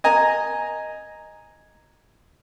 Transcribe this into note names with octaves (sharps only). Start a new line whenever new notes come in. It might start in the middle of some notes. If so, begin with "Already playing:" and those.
D#5 G#5 A#5